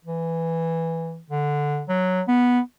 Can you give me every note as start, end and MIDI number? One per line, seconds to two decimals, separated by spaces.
0.05 1.20 52
1.30 1.84 50
1.89 2.22 54
2.28 2.60 59